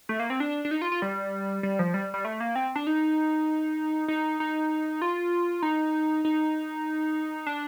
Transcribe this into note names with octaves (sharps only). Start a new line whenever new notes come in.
A3
A#3
C4
D4
D4
D#4
F4
F4
G3
G3
F3
G3
G3
A3
A#3
C4
D4
D#4
D#4
D#4
F4
D#4
D#4
D4